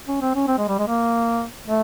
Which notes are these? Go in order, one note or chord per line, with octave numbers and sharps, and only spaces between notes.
C#4
C4
C#4
C4
G#3
G3
G#3
A#3
A3